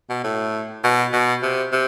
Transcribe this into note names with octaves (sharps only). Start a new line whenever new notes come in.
B2
A2
B2
B2
C3
C3